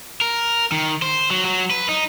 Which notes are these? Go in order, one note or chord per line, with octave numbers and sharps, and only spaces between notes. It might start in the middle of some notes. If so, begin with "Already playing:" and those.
A#4
D#3
C5
F#3
F#3
B4
D#4